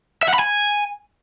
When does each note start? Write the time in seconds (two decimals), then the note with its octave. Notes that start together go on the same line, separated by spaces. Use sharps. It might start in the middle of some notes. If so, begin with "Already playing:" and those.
0.23 E5
0.28 F#5
0.34 B5
0.39 G#5